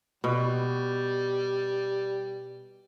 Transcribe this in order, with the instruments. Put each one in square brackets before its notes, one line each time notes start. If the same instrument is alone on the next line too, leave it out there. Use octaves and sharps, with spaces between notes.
[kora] B2 [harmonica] G3